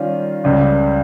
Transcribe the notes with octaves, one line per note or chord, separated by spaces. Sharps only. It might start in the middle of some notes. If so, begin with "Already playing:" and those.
Already playing: D#3 G3 C#4 F4
C#2 C#3 G3